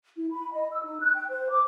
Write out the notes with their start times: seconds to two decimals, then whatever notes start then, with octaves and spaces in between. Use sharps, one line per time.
0.17 E4
0.31 B5
0.52 D#5
0.72 E6
0.84 D#4
1.01 F#6
1.15 G5
1.29 C5
1.50 D6